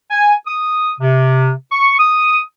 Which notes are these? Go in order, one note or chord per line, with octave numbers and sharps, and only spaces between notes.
G#5
D#6
C3
C#6
D#6